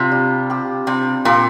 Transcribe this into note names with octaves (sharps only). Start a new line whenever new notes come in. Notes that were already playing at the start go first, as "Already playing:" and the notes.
Already playing: C3 D4 F4
G3
C4 G4
C3 G3
A#2 C4 G4